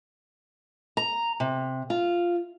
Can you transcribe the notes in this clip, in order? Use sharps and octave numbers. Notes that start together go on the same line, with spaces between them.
A#5
C3
F4